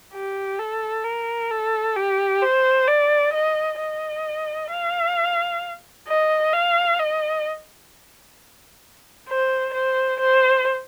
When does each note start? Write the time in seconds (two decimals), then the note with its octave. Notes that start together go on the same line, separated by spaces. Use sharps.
0.14 G4
0.59 A4
1.05 A#4
1.51 A4
1.96 G4
2.42 C5
2.87 D5
3.33 D#5
3.80 D#5
4.70 F5
6.08 D#5
6.53 F5
6.99 D#5
9.28 C5
9.74 C5
10.20 C5